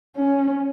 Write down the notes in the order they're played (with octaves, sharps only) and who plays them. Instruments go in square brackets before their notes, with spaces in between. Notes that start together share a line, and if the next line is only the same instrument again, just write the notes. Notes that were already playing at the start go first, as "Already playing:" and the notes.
[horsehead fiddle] C#4